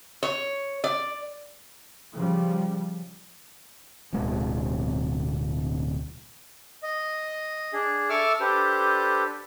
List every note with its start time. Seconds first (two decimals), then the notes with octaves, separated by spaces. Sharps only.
0.23 C#5
0.84 D5
2.15 C#3 F3 G3
4.13 D1 B1 G#3
6.83 D#5
7.73 D4 G#4
8.10 A4 E5 C#6 D6 E6 F6
8.40 D4 G4 A4 B4 C5